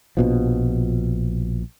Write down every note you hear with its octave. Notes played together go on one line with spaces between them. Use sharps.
A#1 B2 F3